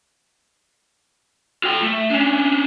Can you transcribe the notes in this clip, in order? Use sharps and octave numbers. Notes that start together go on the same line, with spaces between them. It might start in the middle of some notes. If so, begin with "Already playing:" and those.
F4 G5
A3
C#4 D4